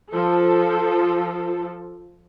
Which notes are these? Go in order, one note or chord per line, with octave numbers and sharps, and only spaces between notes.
F3 A4